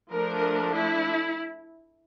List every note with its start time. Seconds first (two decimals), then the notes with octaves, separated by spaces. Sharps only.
0.12 F3 A3 D4 A#4
0.74 E4